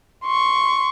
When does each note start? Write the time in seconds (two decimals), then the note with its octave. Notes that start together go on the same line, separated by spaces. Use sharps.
0.25 C6 C#6